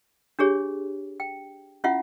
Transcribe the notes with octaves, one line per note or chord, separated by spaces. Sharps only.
D4 G4 G#4 C#5
G5
C#4 E4 F4 E5 F#5